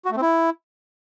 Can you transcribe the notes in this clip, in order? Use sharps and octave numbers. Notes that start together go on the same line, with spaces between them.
F#4
A3
C4
E4